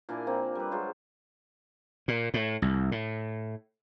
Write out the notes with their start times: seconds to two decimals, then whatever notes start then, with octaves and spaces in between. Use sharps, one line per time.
0.09 A#2 D4 E4 G#5
0.26 F3 A#3 C4
0.55 G3 B4
0.71 F#3 G#3 F4 C5
2.08 A#2
2.34 A2
2.62 C2
2.92 A2